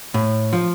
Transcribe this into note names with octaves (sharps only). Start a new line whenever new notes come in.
A2
F3